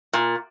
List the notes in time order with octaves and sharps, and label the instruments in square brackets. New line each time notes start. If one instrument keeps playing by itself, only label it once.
[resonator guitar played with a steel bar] A#2